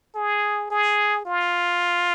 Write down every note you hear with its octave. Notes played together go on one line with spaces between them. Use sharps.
G#4
G#4
F4